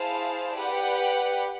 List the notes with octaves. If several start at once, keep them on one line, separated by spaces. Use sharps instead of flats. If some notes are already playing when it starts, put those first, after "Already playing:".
Already playing: E4 G#4 C5 F5 A5
G4 B4 D5 F#5